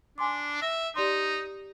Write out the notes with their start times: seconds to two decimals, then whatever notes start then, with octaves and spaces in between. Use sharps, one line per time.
0.18 D4 G#5 C6 D6
0.62 E5 A#6
0.96 D#4 G4 D5 C6